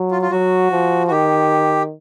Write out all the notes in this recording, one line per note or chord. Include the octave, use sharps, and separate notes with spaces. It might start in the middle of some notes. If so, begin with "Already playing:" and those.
Already playing: F#3
F4
F4
F#3 F#4
F3
F#4
D#3 G4